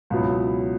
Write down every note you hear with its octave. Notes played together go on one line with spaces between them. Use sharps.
C#2 B2 F#3 B3 E4